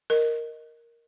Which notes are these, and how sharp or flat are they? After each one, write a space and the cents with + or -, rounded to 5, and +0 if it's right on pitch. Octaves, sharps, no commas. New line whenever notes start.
A#4 +0 D#5 +0